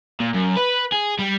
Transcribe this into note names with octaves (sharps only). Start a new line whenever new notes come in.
A#2
F#2
B4
G#4
G3